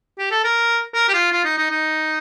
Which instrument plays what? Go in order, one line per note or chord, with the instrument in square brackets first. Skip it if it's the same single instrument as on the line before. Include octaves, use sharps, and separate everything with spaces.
[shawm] G4
A4
A#4
A#4
G4
F4
F4
D#4
D#4
D#4